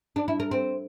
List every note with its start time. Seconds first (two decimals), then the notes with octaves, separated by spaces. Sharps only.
0.16 D4
0.28 E4
0.40 A#4
0.51 C4